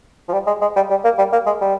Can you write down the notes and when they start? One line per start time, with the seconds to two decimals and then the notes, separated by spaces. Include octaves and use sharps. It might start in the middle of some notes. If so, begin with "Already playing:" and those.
0.29 F3
0.33 G3
0.47 G#3
0.62 G#3
0.76 G3
0.90 G3
1.04 A#3
1.18 G3
1.32 A#3
1.46 G#3
1.61 G3